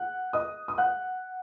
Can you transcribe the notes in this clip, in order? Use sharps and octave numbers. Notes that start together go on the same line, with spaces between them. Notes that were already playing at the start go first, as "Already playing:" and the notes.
Already playing: F#5 F#6
D#5 D#6
D#6
F#5 F#6